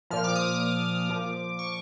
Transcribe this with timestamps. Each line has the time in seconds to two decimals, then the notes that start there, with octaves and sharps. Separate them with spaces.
0.10 A#2 F3 F6
0.24 D6
0.35 D#6
0.48 D6
1.09 A#2 F3
1.59 C#6